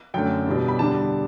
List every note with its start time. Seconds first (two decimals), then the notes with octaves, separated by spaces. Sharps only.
0.14 F#2 D3 A3 G5
0.46 E2 B2 G3 D4
0.68 B5
0.79 E2 D3 G3 D4 A5